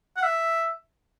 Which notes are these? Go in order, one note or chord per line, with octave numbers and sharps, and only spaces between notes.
F#5
E5